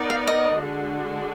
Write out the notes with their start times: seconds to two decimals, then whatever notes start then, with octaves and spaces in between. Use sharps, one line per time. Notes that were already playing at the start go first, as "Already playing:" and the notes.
Already playing: B3 D#4 A#4 D5
0.10 F5
0.27 D#5
0.60 D3 G#3 D4 F#4